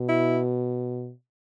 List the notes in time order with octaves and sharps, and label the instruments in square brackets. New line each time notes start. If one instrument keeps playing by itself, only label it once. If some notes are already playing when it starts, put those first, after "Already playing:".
Already playing: [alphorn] B2
[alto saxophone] E4